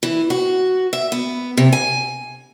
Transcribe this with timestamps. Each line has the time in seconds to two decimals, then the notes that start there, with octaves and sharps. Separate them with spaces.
0.03 E3
0.30 F#4
0.93 E5
1.12 B3
1.57 C3
1.72 G#5